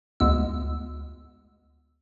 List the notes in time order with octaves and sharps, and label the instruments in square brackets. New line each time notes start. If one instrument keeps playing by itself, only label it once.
[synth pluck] D2 G#3 B3 E6